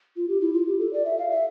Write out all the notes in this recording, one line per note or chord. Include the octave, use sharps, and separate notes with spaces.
F4
G4
E4
F4
G4
A4
D5
E5
F5
E5